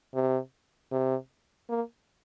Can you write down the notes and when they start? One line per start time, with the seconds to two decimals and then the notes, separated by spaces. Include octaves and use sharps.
0.14 C3
0.92 C3
1.70 A#3